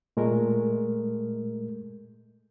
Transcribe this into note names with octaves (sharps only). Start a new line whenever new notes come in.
A#2 G#3 A3 A#4